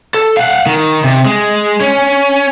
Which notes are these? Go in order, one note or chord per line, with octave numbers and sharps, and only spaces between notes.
A4
F5 F#5
D#3
C3
G#3
C#4